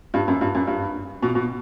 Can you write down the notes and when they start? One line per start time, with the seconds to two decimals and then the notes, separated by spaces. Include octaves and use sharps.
0.14 G2
0.28 F#2
0.41 G2
0.55 F#2
0.67 G2
1.23 B2
1.35 B2